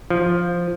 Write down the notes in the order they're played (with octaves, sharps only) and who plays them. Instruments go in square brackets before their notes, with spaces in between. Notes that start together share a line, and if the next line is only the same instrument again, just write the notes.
[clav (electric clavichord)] F3